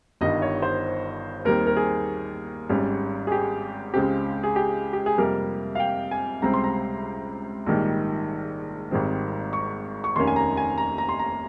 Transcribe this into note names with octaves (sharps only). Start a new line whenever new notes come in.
G1 G2 D#3 D#5
C#5
C5
D#2 D#3 G3 C4 A#4
A#4
G#4
G#1 G#2 G3 C#4
G#4
G4
C#2 C#3 G#3 C4 G4
G#4
G4
G4
G#4
F2 C3 G3 A#3 A#4
F5
G5
G#5
C#2 C3 G3 C4 A#5
C6
A#5
A#1 G#2 D#3 G3
G#1 G#2 D#3 G3 C4
C#6
C#6
F1 D#2 D#3 A#3 C#4 C6
G#5
A#5
G#5
A#5
A#5
C6
A#5